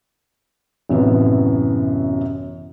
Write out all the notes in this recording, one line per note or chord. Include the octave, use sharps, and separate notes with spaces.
A1 F#2 C3 B3 E4